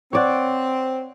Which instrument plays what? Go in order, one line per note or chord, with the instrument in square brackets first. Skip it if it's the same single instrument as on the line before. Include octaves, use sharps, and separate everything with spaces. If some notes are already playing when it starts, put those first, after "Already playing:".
[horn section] C4 [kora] C#5 D5 F#5